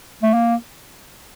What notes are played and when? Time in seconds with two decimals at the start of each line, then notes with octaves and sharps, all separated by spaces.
0.23 A3
0.34 A#3